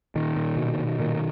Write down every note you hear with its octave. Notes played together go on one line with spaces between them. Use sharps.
A#2 D#3
A#2
B2
B2
A#2 D#3